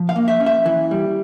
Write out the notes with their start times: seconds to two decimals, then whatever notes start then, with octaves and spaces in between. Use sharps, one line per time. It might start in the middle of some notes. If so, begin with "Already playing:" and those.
Already playing: F3
0.09 F5
0.16 A#3
0.28 E5
0.40 C#4
0.46 E5
0.66 E3
0.91 G3